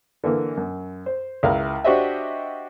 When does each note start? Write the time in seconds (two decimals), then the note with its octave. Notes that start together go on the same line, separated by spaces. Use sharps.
0.24 D3 E3 A#3
0.57 F#2
1.06 C5
1.43 C#2 E4 A#4 F5
1.84 D4 F#4 G4 C5 D#5 E5